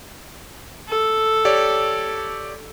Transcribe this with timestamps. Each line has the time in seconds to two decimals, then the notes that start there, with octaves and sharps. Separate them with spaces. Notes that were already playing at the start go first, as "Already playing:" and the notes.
0.88 A4
1.45 G4 C#5 D5